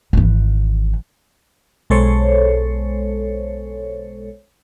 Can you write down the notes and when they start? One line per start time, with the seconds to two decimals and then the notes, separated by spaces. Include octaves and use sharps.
0.13 G#1 E3
1.90 B1 G#3 A4 C5 C#5